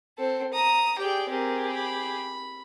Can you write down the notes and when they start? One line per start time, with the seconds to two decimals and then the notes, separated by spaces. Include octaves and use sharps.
0.18 C4 A4
0.53 A#5 D#6
0.98 G4 G#4 D5 G5
1.29 C4 G4 G#4 A#4
1.71 B5